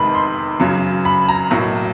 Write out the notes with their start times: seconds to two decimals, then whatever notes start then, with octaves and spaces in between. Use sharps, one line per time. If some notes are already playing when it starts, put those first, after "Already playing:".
Already playing: F1 E2 C3 D#3 G#3 B5
0.15 C6
0.60 F#2 C#3 F#3
1.05 B5
1.29 A#5
1.51 B1 A2 F#3 A#3